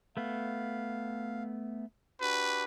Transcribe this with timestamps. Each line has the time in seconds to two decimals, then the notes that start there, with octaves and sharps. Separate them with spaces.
0.17 A3 B3 F5
2.21 D4 F#4 G4 B4